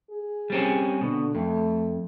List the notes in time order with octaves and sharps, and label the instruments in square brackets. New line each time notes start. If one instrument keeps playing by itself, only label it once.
[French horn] G#4
[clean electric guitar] G3 C4 C#4
[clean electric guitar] B2 [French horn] D3
[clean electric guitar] F2 [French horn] A3